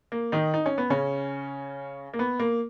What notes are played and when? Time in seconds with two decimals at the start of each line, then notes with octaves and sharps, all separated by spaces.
0.12 A#3
0.32 D#3 D#4
0.54 D#4
0.66 C#4
0.78 B3
0.90 C#3 C#4
2.13 A#3
2.19 B3
2.39 A#3